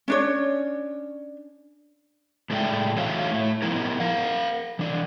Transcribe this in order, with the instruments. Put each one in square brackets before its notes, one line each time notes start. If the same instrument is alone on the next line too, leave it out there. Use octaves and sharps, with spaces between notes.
[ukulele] C#4 D4 C#5
[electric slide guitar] A2 G#3 A4 D5 E5 G5
E3 A3 F#4 C#5 E5 F5
A2 A3
F3 B3 E4 A#4
A#4 F5 F#5
E3 D4